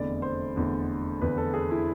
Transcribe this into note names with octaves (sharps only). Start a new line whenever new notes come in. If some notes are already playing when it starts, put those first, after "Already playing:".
Already playing: F1 E2 D3 D5
C5
F1 E2 D3
F1 E2 D3 B4
A4
G#4
E4